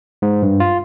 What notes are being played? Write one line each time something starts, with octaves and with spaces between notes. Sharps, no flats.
G#2
G2
F4